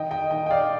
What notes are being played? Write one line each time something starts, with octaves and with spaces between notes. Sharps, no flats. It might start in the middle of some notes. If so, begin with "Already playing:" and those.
Already playing: D#3 D#5 G5
D#5 G5
D#3 D#5 G5
G5
D5 F5